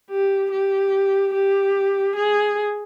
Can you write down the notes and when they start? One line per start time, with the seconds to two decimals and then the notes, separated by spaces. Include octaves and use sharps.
0.10 G4
0.51 G4
1.33 G4
2.16 G#4